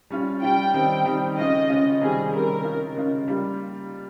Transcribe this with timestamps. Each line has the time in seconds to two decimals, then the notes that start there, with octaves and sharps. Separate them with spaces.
0.10 G3 C#4 F4
0.42 G3 C#4 F4 G5
0.74 D#3 G3 C4 D#4
1.06 D#3 G3 C4 D#4
1.37 C#3 G#3 C#4 F4 D#5
1.69 C#3 G#3 C#4 F4
2.01 C3 D#3 G3 C#4 G#4
2.32 C3 D#3 G3 C#4 A#4
2.64 C#3 G#3 C#4 F4
2.96 C#3 G#3 C#4 F4
3.28 G3 A#3 F4